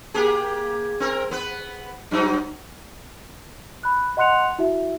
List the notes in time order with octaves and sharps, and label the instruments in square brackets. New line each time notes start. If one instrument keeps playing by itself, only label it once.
[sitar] A#3 G4 G#4
C4 A#4
B3 B4
G2 F#3 D#4
[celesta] B5 F#6
D#5 F#5 C6 F#6 C#7 F7
E4 F#4 E5